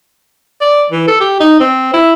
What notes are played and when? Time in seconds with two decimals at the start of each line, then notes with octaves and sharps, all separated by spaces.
0.61 D5
0.91 E3
1.08 A4
1.21 G4
1.40 D#4
1.60 C4
1.94 E4